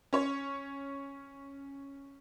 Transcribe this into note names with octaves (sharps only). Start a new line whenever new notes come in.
C#4 C#5